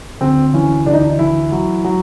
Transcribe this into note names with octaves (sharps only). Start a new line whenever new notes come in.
D2 C4
E3 C#4
D2 D4
D#4
D4
E3 E4
F#3
F#3